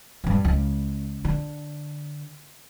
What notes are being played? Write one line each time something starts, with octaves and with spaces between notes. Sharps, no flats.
G2 E3
C#2
D3